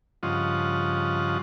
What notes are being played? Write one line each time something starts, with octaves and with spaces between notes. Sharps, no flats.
G2 C#3 F3 F4 D#5 F#5